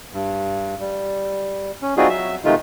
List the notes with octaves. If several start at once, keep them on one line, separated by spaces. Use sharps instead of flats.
G2
G3
C#4
G3 C4 D#4 F4 F#4 G#4
F#3 E5
C3 D#3 G#3 A3 D#4 F4